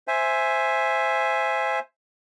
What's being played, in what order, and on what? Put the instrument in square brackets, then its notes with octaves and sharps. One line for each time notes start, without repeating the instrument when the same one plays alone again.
[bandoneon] C5 E5 G#5